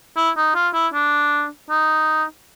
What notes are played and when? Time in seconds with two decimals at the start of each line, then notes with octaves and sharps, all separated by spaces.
0.17 E4
0.37 D#4
0.55 F4
0.74 E4
0.94 D4
1.70 D#4